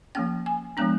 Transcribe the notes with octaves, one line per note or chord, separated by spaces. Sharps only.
F3 A#3 C#4 G5
G#5
F3 G#3 B3 D4 A#5